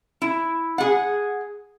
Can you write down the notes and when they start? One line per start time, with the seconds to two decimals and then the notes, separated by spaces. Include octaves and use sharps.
0.22 E4
0.78 G#4 F#5